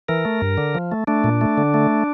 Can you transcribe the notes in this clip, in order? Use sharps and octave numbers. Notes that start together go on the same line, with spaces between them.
E3 A#4
A3
G2
D3
F3
A3
A3 D4
A#2
A3
D3
A3